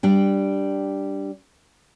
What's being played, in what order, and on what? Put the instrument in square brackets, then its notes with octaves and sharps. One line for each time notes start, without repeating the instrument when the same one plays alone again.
[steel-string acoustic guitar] G3 D4 G5